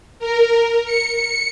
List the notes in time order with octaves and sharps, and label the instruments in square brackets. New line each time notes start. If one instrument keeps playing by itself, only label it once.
[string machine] A#4
C#7